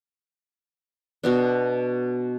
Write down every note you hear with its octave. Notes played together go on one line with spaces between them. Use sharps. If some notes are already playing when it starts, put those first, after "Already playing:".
B2 B3 D4